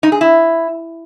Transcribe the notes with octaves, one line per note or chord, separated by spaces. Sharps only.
D#4
G#4
E4